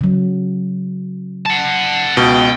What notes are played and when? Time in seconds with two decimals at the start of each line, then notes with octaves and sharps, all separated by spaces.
0.01 C#3 F#3
1.46 F#5 A5
2.17 C#2 B2 G5